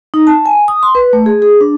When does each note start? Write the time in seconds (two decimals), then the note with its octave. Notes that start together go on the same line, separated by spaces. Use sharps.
0.14 D#4
0.27 A5
0.46 G#5
0.68 D#6
0.83 C6
0.95 B4
1.13 A3
1.26 G#4
1.42 G#4
1.61 D4